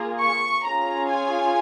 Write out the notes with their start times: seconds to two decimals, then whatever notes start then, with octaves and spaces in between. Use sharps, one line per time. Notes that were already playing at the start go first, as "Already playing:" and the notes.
Already playing: A#3 F4 G#4
0.21 C#6
0.65 C#4 F4 G#4 A#5
1.11 G#5